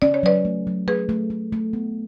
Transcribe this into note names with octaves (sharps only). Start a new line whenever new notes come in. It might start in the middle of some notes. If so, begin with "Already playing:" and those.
C#4 D5
C#5
F#3 B4 D5
A3
F#3
A3 G#4 B4
A3
A3
A3
B3